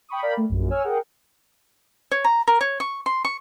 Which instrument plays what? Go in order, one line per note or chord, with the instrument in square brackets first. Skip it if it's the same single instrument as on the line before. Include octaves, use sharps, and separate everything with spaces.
[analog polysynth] G5 B5 C#6 D#6
A#4 D5 F5 G5 A#5 B5
A3
A#1 F#2
C#5 G#5 E6 F6
G#4 A#4 F#5 G5
[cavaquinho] C#5
A#5
A#4
C#5
C#6
C6
C#6